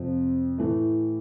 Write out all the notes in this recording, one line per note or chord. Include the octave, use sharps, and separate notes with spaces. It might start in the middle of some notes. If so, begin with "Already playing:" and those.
Already playing: F2 C3 F3
A2 E3 A3